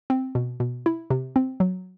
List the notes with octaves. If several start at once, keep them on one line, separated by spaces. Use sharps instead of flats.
C4
B2
B2
E4
C3
C4
F#3